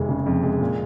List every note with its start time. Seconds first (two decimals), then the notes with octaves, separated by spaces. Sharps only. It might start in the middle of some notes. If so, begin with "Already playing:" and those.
Already playing: F1 F2 D#3 G#3
0.09 C#3
0.26 F2
0.43 G#3
0.61 A#2